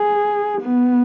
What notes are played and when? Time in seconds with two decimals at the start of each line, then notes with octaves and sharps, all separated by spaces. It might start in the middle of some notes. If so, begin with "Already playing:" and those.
Already playing: G#4
0.62 B3